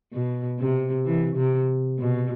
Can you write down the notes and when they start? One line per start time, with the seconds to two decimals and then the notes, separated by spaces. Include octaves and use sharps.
0.13 B2
0.59 C3
1.05 E3
1.36 C3
1.99 B2